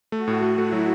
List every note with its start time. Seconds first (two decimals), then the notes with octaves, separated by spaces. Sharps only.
0.12 A3 F#4
0.28 A2
0.42 A3
0.58 A3 E4
0.72 F#3